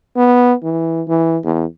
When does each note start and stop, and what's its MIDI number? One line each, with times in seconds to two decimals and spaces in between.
0.16 0.53 59
0.63 1.02 52
1.08 1.38 52
1.43 1.65 40